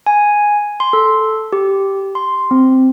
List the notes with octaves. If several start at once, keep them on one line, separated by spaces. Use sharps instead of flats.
G#5
C6
A4
G4
C6
C4